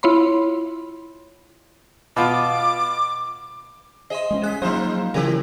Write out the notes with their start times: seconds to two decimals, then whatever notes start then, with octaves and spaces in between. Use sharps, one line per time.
0.03 E4 F4 C#5 B5 C6
2.16 B2 F4 D6
4.10 G#4 C5 D#5 E5 C6
4.31 G#3 B3 C#4
4.43 G#4 F#6 B6
4.62 F3 F#3 A#3 D#4 F4 C5 A#5
5.14 C#3 E3 F3 C#4 E4 G4 G#4 A#4